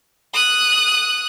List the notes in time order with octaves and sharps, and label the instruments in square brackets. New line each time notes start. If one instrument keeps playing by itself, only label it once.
[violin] D#6 F#6